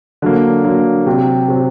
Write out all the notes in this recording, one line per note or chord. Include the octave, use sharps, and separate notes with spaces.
D3 F#3 A#3
D3 F#3 A#3
C3 F#3 C4
C3 F#3 C4